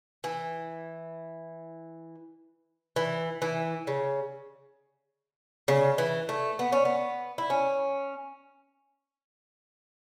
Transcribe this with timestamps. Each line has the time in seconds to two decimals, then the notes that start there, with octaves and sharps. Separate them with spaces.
0.24 E3
2.96 E3
3.42 E3
3.87 C#3
5.68 C#3
5.98 E3
6.29 A3
6.59 B3
6.72 C#4
6.85 B3
7.38 E4
7.50 C#4